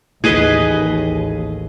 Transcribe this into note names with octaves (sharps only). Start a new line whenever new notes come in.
A1 D#2 G#4 B4 D#5